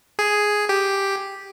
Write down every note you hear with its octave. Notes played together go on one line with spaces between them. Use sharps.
G#4
G4